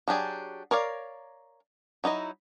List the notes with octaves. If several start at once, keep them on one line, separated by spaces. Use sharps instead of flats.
F#3 D4 G4 G#4
A#4 C#5 D5 F5
F#3 D#4 E4 D#5